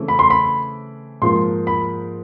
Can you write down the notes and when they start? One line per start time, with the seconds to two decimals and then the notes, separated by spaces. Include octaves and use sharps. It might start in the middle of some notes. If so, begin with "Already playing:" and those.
Already playing: C#3 E3 A3 C4
0.08 B5
0.19 C6
0.30 B5
1.22 G#2 F3 A#3 C6
1.67 B5